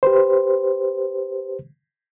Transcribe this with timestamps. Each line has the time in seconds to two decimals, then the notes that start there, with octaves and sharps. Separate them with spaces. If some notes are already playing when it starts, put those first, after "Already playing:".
0.03 G4 B4 C5